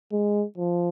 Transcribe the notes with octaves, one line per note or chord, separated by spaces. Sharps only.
G#3
F3